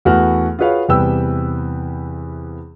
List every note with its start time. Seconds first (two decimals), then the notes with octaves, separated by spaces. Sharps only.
0.05 E2 A3 F#4 B4 F6
0.59 F4 F#4 G#4 B4 C#5 F5
0.88 E2 C3 G3 B4 G5 E6